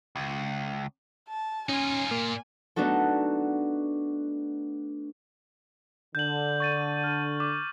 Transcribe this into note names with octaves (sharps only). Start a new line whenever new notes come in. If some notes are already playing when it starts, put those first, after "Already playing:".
C#2
A5
C#4 D#4 F4 G#5
A#2 A#3 F4
A3 B3 D4 D#4 F#4 A4
D3 G6 F#7
C#6 A6 D#7
F6
D6